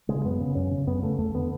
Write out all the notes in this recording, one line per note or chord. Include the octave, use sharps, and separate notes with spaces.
C#3 G#3
F#2 B3
C#3
F#2 C#4
C#3
F#2 B3
C#3 A3
E2 A3
D3 B3